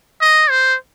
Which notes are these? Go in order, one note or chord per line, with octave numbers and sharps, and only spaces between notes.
D#5
C5